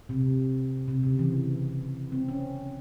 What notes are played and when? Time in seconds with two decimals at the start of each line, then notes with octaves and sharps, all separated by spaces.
0.09 C3
0.88 C3
1.03 C#3
1.19 E3
2.12 C4
2.28 C#4